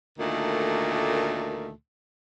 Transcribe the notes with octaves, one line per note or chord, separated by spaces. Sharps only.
D2 A#2 D#3 A3